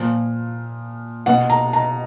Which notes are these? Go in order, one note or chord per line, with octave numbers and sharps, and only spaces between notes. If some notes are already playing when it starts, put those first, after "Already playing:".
Already playing: A#2 F3
B2 F#5
A#5
A#5